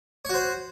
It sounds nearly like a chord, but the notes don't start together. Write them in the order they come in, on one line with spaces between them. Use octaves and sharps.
C#5 F#4 C5